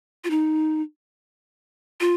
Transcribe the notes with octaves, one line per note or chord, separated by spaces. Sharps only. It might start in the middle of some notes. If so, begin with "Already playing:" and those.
F4
D#4
F4